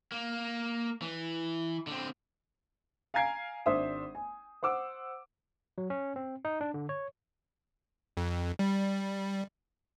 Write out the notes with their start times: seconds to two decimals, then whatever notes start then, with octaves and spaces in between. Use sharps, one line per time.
0.12 A#3
1.02 E3
1.87 D3 C4
3.14 F5 G#5 A#5 G#6 C7 D7
3.66 G#1 D4 C5 E5 D#6
4.15 G#5
4.63 C5 F#5 D6 E6
5.78 F#3
5.90 C#4
6.16 C4
6.45 D#4
6.61 D4
6.74 D3
6.89 C#5
8.17 F2
8.59 G3